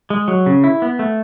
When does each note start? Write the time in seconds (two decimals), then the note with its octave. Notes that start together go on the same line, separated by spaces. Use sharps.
0.10 G#3
0.28 F#3
0.46 C#3
0.64 E4
0.82 B3
0.99 A3